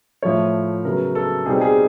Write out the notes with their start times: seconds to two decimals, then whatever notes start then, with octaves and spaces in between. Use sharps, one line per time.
0.22 A2 F3 A3 C#5
0.84 C#3 F#3 B3 A#4
1.15 A4
1.46 B2 G3 C4 D#4 G#4
1.61 G#4